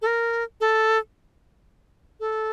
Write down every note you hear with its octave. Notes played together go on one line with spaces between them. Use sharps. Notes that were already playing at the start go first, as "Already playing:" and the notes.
A4
A#4
A4
A4